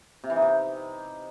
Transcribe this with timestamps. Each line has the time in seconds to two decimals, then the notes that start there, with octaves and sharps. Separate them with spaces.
0.24 C3
0.30 E3
0.36 D#4
0.42 C3